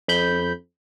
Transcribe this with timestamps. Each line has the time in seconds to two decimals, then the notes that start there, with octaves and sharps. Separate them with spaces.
0.08 F2 B5 G6